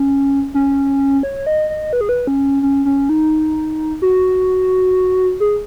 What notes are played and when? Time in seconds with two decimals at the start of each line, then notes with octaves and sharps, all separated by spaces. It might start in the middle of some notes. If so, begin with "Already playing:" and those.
Already playing: C#4
0.54 C#4
1.23 C#5
1.46 D#5
1.70 D#5
1.93 B4
2.01 G#4
2.09 B4
2.27 C#4
2.62 C#4
2.85 C#4
3.09 D#4
4.02 F#4
5.40 G#4